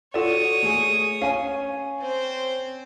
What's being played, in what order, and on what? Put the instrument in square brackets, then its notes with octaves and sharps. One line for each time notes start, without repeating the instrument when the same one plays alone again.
[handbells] F4 A4 D5 [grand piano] F#4 E7 [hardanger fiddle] C#5 D#6
[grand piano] A3 G#4
[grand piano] C#4 G#5 D#7 [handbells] F5
[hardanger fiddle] C4 C5